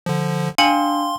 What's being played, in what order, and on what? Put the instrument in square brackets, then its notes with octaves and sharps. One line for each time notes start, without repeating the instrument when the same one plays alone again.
[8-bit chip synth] D3 F3
[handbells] D4 [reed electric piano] F5 G5 [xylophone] G#5 C#7 F#7 [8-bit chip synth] C6